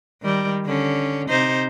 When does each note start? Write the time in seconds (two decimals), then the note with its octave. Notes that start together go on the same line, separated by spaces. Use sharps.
0.22 D#3 G3
0.66 D3 C#4
1.29 C3 D#4 C5